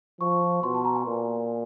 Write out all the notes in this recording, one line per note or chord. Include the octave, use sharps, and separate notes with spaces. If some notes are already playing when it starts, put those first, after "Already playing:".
F3 C#6
B2 C6
A5
A#5
G#5
A#2